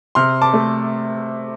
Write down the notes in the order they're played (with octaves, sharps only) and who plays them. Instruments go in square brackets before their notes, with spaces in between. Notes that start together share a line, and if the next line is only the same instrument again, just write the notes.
[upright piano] C3 C6 F6
A5 D6
A3